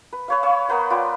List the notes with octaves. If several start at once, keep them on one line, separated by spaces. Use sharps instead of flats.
B4
B4 C#5 F5
C#5 F5 C#6 E6
B3 A#4 B4 F#5
F4 D5 G5